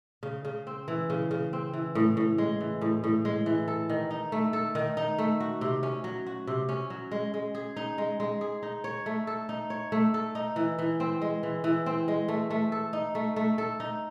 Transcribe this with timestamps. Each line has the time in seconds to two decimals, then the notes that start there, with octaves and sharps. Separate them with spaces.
0.23 C#3
0.45 C#3
0.67 C4
0.88 E3
1.10 C#3
1.31 C#3
1.53 C4
1.74 E3
1.95 A2
2.17 A2
2.38 G#3
2.60 E3
2.81 A2
3.04 A2
3.25 G#3
3.46 E3
3.68 A4
3.90 D#3
4.11 D#4
4.32 A3
4.53 A4
4.75 D#3
4.97 D#4
5.18 A3
5.40 F#4
5.61 C3
5.83 C#4
6.04 F#3
6.27 F#4
6.47 C3
6.69 C#4
6.90 F#3
7.12 G#3
7.34 G#3
7.55 G#4
7.76 D#4
7.98 G#3
8.20 G#3
8.41 G#4
8.63 D#4
8.84 C#5
9.06 A3
9.27 A4
9.49 D#4
9.70 C#5
9.92 A3
10.14 A4
10.35 D#4
10.56 E3
10.79 E3
11.00 C4
11.22 G#3
11.43 E3
11.64 E3
11.86 C4
12.08 G#3
12.28 A3
12.51 A3
12.72 A4
12.93 D#4
13.15 A3
13.36 A3
13.58 A4
13.80 D#4